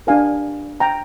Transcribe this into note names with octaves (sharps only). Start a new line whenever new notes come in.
D4 G4 A#4 F5 G#5
G5 A#5